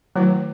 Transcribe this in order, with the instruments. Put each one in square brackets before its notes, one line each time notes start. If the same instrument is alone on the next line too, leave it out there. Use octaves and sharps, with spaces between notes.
[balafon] D#3 A3 E4 B4 [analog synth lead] F#3